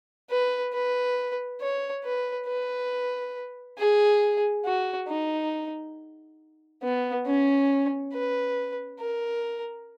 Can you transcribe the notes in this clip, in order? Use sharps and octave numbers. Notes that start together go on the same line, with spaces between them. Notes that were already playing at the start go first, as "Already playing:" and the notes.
B4
B4
C#5
B4
B4
G#4
F#4
D#4
B3
C#4
B4
A#4